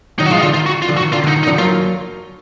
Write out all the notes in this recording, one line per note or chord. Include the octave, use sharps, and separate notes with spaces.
D#3 F#3 D#4
F#4
F3 G#3 F4
D#4
D3 F4
D#3 F4
F#4
F4
D3 F3
F#4
D#3
D3 F4
D3
D#4
D#3
D#4
D3 F3
F#3 A#3 F4